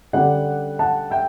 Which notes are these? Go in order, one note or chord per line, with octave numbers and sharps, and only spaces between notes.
D3 G3 C#4 D5 F#5
F#5 A5
E5 G5